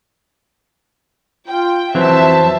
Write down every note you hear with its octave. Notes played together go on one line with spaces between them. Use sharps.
F4 G5
F2 E3 F#3 C5 E5 A5